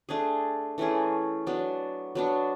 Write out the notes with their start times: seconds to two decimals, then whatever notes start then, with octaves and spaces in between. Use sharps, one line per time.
0.09 A3 D4 G#4
0.78 E3 A3 C#4 G#4
1.47 F#3 B3 D4
2.15 F#3 B3 D4